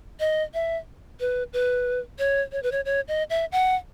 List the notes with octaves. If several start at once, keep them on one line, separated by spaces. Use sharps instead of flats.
D#5
E5
B4
B4
C#5
C#5
B4
C#5
C#5
D#5
E5
F#5